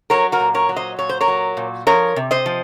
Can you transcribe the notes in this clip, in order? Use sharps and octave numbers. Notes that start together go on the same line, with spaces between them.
F#3 A#4 C#5
F#4 A#4
A#2
A#4 C#5
F#3
C5 D#5
A#2 C#5
C5
A#4 C#5
F#3
A#2
F3 A#4 C#5
C3
C5 D#5
F3